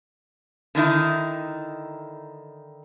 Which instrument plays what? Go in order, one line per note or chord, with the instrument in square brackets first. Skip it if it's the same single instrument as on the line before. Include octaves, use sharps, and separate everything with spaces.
[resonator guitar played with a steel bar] D3 D#3 D#4 E4